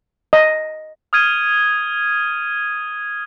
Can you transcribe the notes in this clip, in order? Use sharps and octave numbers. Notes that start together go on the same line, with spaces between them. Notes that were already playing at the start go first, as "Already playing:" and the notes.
D#5
D#6 F6 G#6 D#7